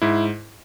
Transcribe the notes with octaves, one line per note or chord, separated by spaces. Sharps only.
G#2 E4